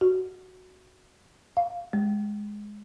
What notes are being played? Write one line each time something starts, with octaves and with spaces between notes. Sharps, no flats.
F#4
F5
G#3